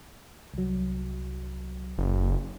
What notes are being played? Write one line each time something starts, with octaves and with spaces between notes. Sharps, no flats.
C2 F#3
F#1